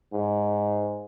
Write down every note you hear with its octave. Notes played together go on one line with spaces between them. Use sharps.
G#2